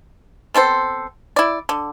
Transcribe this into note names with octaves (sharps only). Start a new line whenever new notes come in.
B3 C4 A4 C5
E4 D5
D3